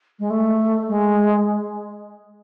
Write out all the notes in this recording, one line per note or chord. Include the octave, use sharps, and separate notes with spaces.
G#3
A3
G#3